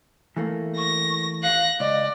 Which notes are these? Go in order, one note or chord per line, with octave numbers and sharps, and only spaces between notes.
E3 A3 A#3
C#6 A#6
F5 F#6 A#6
C#2 D5 D#5